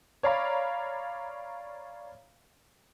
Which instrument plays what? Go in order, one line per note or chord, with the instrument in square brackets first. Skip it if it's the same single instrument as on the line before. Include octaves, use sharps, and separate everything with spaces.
[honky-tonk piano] C#5 D5 F5 A#5 B5